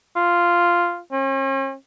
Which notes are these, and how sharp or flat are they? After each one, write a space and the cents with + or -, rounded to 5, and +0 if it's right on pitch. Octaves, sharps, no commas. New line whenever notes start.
F4 -5
C#4 -45